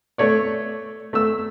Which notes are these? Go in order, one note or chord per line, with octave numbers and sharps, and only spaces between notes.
A3 C#5 D5
A3 E6